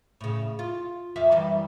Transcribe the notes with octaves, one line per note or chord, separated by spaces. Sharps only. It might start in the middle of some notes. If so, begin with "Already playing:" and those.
A2 C#3
F4
F2 E5 F5
F#2 E3 G3